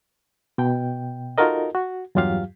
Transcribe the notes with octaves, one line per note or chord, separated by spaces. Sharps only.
B2 G5
D#4 F4 F#4 A4 A#4 D#5
F#4
E2 G2 F#3 F4 G4 F5